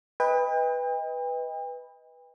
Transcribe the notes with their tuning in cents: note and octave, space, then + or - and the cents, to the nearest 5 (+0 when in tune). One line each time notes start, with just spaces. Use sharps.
B4 +0 D#5 +20 G5 +40